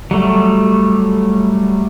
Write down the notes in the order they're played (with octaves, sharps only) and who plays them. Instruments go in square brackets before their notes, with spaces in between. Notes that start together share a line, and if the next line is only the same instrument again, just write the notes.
[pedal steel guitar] F#3 G3 A3